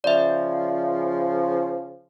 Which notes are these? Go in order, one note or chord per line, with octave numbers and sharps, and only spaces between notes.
C#3 F3 D5 E5